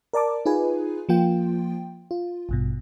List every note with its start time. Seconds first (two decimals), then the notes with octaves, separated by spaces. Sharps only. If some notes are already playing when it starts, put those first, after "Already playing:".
0.13 A#4 D5 A5 D6
0.46 D#4 F4 G#4 B4 G#5
1.09 F3 A#3 F4 G5
2.11 F4
2.49 A1 G2 B2